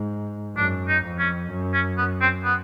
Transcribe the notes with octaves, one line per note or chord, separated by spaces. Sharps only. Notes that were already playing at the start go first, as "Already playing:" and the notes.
Already playing: G#2
F#2 D4
D#4
F2
C#4
F#2
C#4
B3
C4
B3